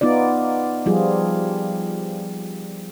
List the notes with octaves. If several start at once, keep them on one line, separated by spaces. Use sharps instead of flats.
B3 D#4 F4 D5
F3 G3 F4 G#4